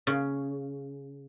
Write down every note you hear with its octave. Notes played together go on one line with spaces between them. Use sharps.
C#3